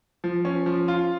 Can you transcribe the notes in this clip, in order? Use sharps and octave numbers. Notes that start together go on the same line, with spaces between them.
F3
C#4
F3
F4